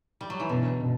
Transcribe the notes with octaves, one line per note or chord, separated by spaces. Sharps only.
G3
F#3
E3
B2 D3
B2